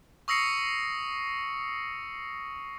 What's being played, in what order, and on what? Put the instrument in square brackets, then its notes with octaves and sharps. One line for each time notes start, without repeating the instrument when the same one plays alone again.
[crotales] C#6 D#6 E6 A#6 C7 C#7